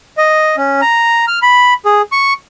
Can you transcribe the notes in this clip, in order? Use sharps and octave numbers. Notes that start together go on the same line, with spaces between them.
D#5
C#4
A#5
F6
B5
G#4
C#6